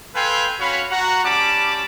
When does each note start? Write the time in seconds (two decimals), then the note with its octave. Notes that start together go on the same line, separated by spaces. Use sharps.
0.15 A4 B4 F5 G5 G#5 C6
0.60 C#4 F#4 C#5 F5 B5
0.91 F#4 F#5 A#5
1.25 G3 C#4 A5 B5 D6